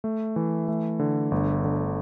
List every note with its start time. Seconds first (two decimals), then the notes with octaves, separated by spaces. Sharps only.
0.04 A3
0.36 E3
0.68 A3
0.99 D3
1.31 G1
1.64 D3